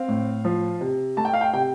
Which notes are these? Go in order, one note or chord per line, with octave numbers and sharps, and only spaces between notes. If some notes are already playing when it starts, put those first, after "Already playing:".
Already playing: C4 F5
A2
F3
C3
A3 A5
G5
F5
G5
C3 G5